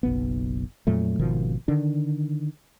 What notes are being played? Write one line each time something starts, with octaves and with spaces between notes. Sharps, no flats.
F#1 B1 B3
F2 A#2 F#3 A3
G#1 B2 D#3 F3
D3 D#3 D4